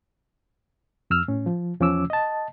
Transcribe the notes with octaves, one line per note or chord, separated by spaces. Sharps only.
F2 E6 F6
A2 C#4
F3
E2 F3 C#4 D6 E6
D#5 A5